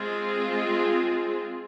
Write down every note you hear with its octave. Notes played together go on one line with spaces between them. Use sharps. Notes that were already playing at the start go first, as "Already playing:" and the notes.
Already playing: G#3 C4 F4 G#4